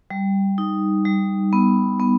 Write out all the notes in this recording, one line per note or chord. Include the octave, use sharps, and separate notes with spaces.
G3
D#4
G3
B3
B3